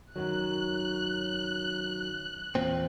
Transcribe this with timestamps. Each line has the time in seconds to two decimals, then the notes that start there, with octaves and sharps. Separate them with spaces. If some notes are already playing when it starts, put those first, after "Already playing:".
0.16 F#2 D#3 F#3 F#6
2.55 E2 A#2 C4